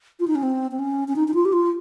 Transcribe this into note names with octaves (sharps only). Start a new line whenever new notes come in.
F4
D#4
C#4
C4
C4
C#4
C#4
D#4
D#4
F4
G4
F4